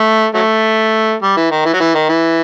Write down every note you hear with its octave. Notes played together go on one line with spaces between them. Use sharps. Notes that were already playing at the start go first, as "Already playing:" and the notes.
Already playing: A3
F#3 A3
G3
E3
D#3
E3
F#3
E3
D#3
E3